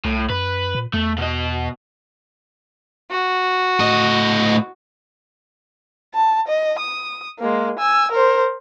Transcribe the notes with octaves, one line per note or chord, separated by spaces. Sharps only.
C2 A2
F#2 B4
A#2
E2 A3
B2 D#5
F#4
A2 D#5
A5
D#5
D#6
G#3 A#3
G#5 E6
A#4 C5